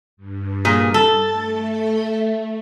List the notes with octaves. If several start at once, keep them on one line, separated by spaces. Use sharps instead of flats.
G2
A#2 G#4
A4 A6
A3